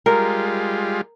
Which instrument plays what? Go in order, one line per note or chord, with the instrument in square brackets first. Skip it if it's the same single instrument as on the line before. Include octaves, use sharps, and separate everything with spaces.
[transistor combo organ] G3 G#3 F4 [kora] A#4